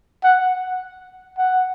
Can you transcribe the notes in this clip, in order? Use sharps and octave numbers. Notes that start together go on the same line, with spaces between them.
F#5
F#5